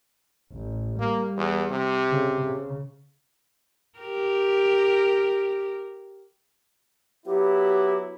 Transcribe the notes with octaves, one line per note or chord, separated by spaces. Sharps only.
A1
G3 A#3
E2
C3
C#3
C#3
G4 A#4
F#3 B3 E4 G4